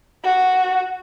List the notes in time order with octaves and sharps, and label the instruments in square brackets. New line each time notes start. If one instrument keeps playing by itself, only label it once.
[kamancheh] F#4